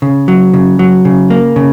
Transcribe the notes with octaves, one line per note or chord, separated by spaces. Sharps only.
C#3
F#3
C#3
F#3
C#3
A#3
C#3